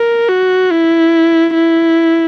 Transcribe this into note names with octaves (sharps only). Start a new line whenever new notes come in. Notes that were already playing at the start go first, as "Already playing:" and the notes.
Already playing: A#4
F#4
E4
E4